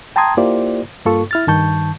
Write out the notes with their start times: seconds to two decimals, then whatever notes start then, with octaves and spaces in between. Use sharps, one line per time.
0.16 G5 A5 A#5 C6 D#6 G#6
0.37 A#3 E4 F4 G4 C5 D5
1.05 G2 A#3 F4 A4 C#6
1.31 E4 F6 A6
1.48 G2 D#3 A5 C#6 G6